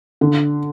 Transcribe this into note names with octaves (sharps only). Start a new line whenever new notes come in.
D3